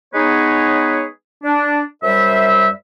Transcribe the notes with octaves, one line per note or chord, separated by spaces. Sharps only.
G#3 B3 D#4 G#4 B4 C#5
D4
F#2 G3 C5 E5